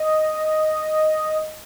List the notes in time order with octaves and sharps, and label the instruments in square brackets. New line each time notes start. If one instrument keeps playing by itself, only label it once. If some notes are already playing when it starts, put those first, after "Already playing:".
Already playing: [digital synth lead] D#5